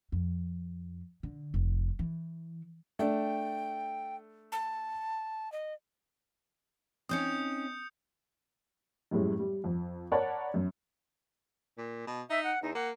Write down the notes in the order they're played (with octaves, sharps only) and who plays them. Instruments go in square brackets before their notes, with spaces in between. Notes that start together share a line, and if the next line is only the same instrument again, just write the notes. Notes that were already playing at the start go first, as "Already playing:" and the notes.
[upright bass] F2
D3
F1
E3
[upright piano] A3 D4 [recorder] G5
[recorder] A5
D#5
[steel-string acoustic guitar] C4 C#4 D#4 [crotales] D#6 G6 C#7
[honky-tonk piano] F#2 A2 G3 G#3
G3
F2
A#4 C#5 D5 F#5 A5 B5
F#2
[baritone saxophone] A#2
B2
[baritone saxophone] D#4 [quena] E5
[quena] F#5
[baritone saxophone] E2 [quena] D#4
[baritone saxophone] A#3 [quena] F#5